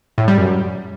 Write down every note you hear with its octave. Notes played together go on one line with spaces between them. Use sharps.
A2
G3
F#2